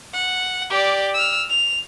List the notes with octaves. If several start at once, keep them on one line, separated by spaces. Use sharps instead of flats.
F#5
G4 D5
E6 F6
F7